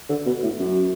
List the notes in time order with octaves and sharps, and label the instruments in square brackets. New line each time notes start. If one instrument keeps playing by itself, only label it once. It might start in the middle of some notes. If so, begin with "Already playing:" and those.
[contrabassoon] D3
B2
A2
F#2